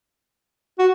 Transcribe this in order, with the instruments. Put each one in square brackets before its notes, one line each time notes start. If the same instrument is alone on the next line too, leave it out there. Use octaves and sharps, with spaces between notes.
[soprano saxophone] F#4